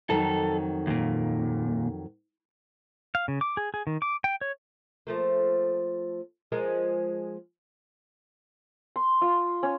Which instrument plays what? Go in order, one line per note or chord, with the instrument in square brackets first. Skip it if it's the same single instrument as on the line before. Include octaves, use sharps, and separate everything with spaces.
[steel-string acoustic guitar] F2 D#3 F#3 [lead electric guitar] A4
[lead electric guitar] D#2 A#2
[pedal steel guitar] F5
C#3
D6
G#4
G#4
D#3
D6
G5
C#5
[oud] F3 A3 A#3
F3 G#3 A#4
[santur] C6
F4
C#4